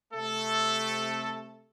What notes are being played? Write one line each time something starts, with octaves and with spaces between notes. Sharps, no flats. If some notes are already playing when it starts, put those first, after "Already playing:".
C3 A3 A4